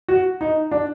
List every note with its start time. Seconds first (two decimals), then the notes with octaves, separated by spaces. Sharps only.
0.08 F#4
0.41 D#4
0.71 D4